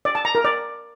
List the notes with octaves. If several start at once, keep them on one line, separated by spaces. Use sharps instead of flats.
D5
A5
A#5
A#4
D5